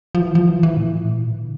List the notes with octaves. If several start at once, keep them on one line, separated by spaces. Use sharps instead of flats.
F3
E3
F3
E3
E3
A2
A#2
D3